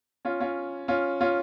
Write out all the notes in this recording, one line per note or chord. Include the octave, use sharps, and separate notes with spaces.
C#4 F4
C#4 F4
C#4 F4
C#4 F4